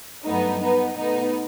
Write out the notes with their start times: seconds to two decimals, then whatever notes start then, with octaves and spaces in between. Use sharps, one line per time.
0.25 G2 F#3 A3 B3 D#4
0.61 B3 D#4
0.97 B2 A3 B3 D#4